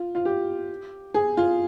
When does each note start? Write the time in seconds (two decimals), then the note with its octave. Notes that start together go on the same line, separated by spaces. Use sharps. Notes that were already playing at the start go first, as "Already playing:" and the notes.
Already playing: F4
0.15 F4
0.25 G4
1.14 G#4
1.37 F4